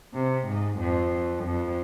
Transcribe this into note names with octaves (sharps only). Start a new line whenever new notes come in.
C3
G#2
F2
F2